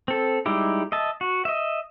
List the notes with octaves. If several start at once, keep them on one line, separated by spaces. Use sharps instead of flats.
C4 A4
G3 G#3 D#4 E4 G4
D#5 E5 A5
F#4
D#5 E5